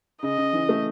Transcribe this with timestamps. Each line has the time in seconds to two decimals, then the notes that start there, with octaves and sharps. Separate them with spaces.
0.23 C#3 D#5
0.38 C#3
0.53 E3
0.69 A3